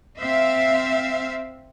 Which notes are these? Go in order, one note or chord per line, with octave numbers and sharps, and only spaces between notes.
C4 E5 F5